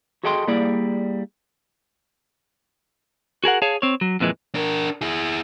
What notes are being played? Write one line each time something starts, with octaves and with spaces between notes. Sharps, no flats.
F#4 G#4 A4 D#5 G5 C6
G3 A#3 E4 G#4 D5
F#4 G#4 A#4 F#5
G#4 C#5 F5 A5
C4 C#5
F#3
F2 A#2 E3 G#3
D4 A#4
E4 G#4